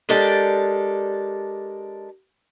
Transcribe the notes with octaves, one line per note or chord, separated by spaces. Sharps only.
G#3 D4 G4 A4 A#4 D5